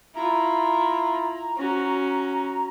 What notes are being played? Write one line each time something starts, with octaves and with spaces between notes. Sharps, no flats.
E4 F4 A#5
C#4 F#4